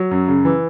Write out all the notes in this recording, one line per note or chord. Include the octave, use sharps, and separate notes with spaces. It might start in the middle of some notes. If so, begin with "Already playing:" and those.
Already playing: F#3
F#2
C#3
E3